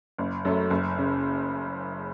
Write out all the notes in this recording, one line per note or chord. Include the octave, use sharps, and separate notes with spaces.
F#1
F#2 F#3 A3
F#1
C#3